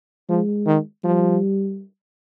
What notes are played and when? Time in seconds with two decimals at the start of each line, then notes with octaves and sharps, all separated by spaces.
0.29 F3 G#3
0.67 D#3
1.04 F3 G3